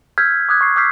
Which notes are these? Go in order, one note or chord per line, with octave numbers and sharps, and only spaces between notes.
E6 F6 G6 G#6 B6
D6 D#6 F#6 G#6 B6
C#6 C7
D6 E6 F6 G6 B6 C7